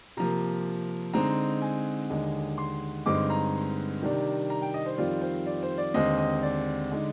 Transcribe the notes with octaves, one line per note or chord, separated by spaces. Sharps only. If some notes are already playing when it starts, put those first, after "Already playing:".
C3 F3 A#3 A#5
D3 G#3 C4 D#4 A#5
G#5
D#2 D3 G#3 D#4
C6
G2 D3 G#3 C4 D#4 D6
A#5
C3 D#3 G3 D4
A#5
G5
D#5
C5
F2 D#3 G3 C4 F4 D5
C5
D5
C5
D5
D#2 D3 G#3 C4 D#5
D#5
D5
D3 G#3 D#4